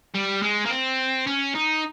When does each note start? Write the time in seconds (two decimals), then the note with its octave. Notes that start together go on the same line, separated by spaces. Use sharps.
0.14 G3
0.42 G#3
0.66 A#3
0.71 C4
1.27 C#4
1.55 D#4